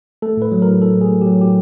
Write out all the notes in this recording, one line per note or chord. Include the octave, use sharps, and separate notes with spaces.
A3 A4
A2 B4
F#3
A2 A#4
A2 A4
A2 G#4
A3
F#3 G4
A2 G4